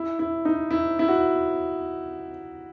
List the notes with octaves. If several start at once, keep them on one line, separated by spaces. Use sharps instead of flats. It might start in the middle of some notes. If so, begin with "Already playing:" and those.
Already playing: E4
E4
D#4
E4
E4
F#4